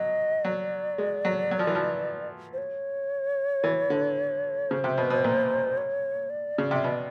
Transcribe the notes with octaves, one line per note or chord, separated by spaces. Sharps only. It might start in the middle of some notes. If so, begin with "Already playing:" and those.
Already playing: F#3 D#5
F#3 D5
G#3
F#3
F#3
F3
E3
F3
C5
C#5
E3
D3
C#3 C5
C3
B2
B2
A#2
C#5
D5
C#3
C3
B2